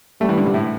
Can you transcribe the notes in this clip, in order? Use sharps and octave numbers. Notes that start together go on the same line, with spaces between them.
G3 A3
E3
D3
C3
A2